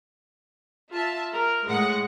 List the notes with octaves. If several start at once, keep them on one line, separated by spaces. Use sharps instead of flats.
F4 E5 A5
A#4
A2 G#3 F#5 A#6